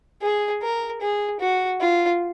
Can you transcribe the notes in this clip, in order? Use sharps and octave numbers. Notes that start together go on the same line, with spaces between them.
G#4
A#4
G#4
F#4
F4